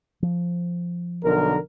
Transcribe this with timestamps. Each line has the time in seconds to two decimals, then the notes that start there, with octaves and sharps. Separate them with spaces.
0.22 F3
1.24 B1 D3 A#4